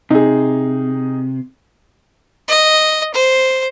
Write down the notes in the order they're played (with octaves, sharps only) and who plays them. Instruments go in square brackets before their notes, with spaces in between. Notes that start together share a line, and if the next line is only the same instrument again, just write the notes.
[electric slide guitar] C3 [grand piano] D#4 G#4
[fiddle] D#5
C5